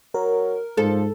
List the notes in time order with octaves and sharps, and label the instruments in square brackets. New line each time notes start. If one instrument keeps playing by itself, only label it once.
[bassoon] F#3 [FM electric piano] A#4
[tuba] G#2 [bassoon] F3 [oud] A4